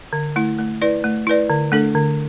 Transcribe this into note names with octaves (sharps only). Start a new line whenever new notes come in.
D3
A3 E4
A3
E4 B4 D5
A3
E4 B4 D5
D3
A3 D4 A4
D3